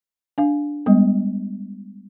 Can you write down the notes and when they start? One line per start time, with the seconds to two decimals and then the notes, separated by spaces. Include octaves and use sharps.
0.38 D4 F5
0.86 G3 G#3 B3